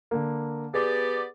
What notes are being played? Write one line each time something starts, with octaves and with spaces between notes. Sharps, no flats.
D3 A#3
B3 G4 G#4 D5